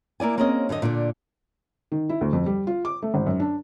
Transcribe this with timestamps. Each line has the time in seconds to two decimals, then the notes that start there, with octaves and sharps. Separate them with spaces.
0.20 A#3 E4 D5 G#5
0.38 A#3 C4 C#4 G#4 C#5 D#5
0.69 F#2 D3 G#4 D#5
0.82 A#2 D3 D4 D5
1.92 D#3
2.09 E4
2.21 D2
2.33 F2
2.46 G3
2.67 F4
2.85 D6
3.03 A3
3.14 G#1
3.26 F#2
3.40 D4